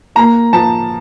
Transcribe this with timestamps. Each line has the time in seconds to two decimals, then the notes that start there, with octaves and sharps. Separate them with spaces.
0.16 A#3 A#5
0.53 F3 A5